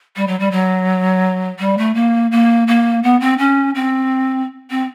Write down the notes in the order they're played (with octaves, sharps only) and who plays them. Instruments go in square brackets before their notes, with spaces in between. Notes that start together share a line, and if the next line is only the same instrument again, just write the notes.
[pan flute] G3
F#3
G3
F#3
G3
A3
A#3
A#3
A#3
B3
C4
C#4
C4
C4